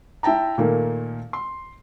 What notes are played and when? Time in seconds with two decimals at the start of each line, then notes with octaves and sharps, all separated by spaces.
0.23 E4 E5 G5 A5 A#5
0.58 A#2 D#3 A3 A#3
1.33 C6